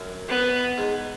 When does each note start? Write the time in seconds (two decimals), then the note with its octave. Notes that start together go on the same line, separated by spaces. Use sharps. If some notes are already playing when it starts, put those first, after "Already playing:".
Already playing: F#2
0.29 B3
0.78 G#2